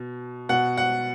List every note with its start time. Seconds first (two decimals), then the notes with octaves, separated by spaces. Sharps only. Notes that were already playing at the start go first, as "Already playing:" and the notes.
Already playing: B2
0.49 B2 F#5
0.77 F#5